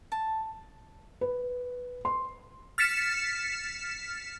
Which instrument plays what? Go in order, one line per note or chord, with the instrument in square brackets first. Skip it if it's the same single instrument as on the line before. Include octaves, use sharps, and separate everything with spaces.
[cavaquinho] A5
[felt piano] B4
C6
[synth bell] F6 A6 B6 C#7 E7